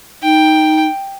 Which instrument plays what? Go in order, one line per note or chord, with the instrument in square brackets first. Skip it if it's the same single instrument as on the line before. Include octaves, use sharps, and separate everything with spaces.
[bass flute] D#4 [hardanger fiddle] G5